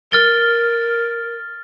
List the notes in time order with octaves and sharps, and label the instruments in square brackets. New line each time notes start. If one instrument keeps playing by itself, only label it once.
[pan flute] A#4 [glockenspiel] F6 A6 G7